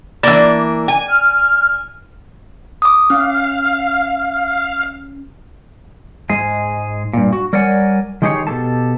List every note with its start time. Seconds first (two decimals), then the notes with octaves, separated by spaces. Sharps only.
0.23 E3 A#3 D4 D5
0.88 G#5
1.09 F6
2.82 D6 D#6
3.10 C#4 F5
6.30 G#2 G#3 G#4 G#5
7.13 G2 A#2
7.33 F#4
7.53 G3 A#4 C#5 D5 F#5 G#5
8.22 D#3 G#3 D#4 G4 G#4 C#5
8.47 B2 E3 G4 A4 A5